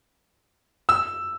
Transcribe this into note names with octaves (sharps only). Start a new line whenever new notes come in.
E6